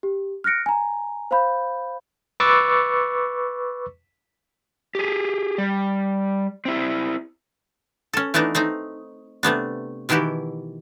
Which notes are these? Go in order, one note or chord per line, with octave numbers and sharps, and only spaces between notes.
G4
F6 F#6 A#6 C#7 D7
G#5 A#5
C5 F5 B5 G6
B4 C#6 D6 E6 A6 C#7
G4 G#4
G3
C4 E4
C#4 A4
E3 A3 B3 D4 D#4
A3 C4 D#4
C3 A3 B3 D4
B2 D#3 E3 E4 F#4 G4